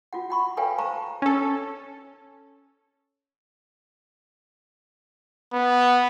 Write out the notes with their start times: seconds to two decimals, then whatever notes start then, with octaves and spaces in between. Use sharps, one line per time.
0.13 F4 F#4 F#5
0.30 F#5 B5 C#6
0.57 A4 B4 C#5 F5 G5 G#5
0.79 C5 F5 A5 A#5 C#6
1.22 C#4 A4
5.53 B3